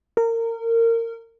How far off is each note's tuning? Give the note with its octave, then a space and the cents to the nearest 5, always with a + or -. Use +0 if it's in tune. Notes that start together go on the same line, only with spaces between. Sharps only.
A#4 -25